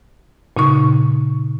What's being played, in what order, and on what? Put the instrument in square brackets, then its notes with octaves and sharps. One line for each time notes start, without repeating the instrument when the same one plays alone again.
[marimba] A#2 C#3 D#4 C#6